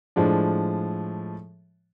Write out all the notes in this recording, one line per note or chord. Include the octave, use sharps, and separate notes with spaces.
A2 F3 G#3 D4